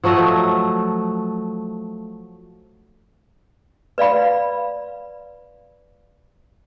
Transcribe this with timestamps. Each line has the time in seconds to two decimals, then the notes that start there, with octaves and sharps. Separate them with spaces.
0.04 F3 F#3 A3 D#5
3.98 B4 D5 F5 B5